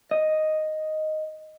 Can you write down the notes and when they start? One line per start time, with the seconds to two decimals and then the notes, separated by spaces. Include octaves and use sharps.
0.11 D#5